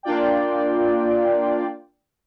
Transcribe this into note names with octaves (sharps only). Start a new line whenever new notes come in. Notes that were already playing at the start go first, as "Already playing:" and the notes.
A#3 D4 F4 D5 G5